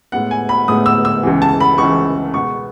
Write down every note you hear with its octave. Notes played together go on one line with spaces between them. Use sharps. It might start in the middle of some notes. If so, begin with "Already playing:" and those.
A2 G#3 B3 F#5
G#5
B5
A2 G#3 B3 D#6
E6
E6
C#2 C#3 E3
A5
B5
C#2 C#3 E3 C#6
B2 G#3 B3 C#6